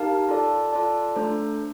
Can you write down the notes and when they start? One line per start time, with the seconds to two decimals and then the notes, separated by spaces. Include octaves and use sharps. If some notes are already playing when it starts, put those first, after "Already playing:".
Already playing: D#4 G4 A#4 F5 A5
0.28 F4 A4 D5 A5
0.72 F4 A4 D5 A5
1.16 A3 D4 A4 C5